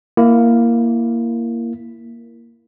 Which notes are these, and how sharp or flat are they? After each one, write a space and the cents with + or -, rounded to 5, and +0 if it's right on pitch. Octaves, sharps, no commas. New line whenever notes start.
A#3 +0 E4 +20